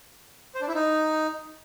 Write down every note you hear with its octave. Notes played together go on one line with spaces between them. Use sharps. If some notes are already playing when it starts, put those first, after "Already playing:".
C5
D4
E4
D#4